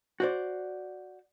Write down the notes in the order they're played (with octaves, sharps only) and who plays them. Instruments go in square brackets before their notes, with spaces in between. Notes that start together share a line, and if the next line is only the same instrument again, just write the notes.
[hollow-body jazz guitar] F#4 C5 D5